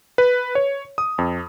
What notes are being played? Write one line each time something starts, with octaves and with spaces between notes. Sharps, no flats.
B4
C#5
D#6
F2